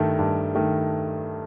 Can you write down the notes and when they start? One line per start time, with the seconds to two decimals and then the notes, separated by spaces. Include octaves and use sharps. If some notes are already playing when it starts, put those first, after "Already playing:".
Already playing: G2 D#3 A3
0.19 G2
0.55 D#3 A3